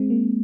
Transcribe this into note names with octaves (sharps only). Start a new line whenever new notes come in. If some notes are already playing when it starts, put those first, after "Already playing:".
Already playing: G#3 C4
A#3